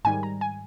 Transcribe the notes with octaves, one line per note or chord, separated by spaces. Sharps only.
G#2 D#3 G3 G#5
A#5
G#5